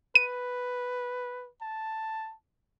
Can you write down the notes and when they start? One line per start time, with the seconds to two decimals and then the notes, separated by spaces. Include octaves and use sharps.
0.15 B4 D#7
1.61 A5